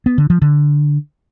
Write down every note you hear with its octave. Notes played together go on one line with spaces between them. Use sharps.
B3
D3
F3
D3